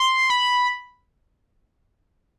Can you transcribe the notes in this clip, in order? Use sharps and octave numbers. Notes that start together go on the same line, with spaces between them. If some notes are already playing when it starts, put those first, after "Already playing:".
Already playing: C6
B5